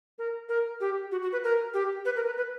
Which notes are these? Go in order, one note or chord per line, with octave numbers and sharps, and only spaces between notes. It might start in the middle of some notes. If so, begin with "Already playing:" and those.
A#4
A#4
G4
F#4
F#4
B4
A#4
G4
B4
A#4
B4
B4